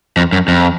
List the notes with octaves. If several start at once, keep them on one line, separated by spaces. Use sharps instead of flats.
F2
F#2
F2